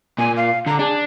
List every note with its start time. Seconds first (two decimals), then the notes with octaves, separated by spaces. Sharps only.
0.18 A#2 G#5
0.37 F5
0.66 D3 A#5
0.79 D4 G#4